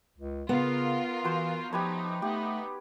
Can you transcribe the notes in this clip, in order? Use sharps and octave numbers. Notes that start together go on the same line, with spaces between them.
C#2
C#3 B3 F4 A#4
E3 F#4 C5
F3 A3 D#4 G4 B4 C#5
A3 B3 D#4 G4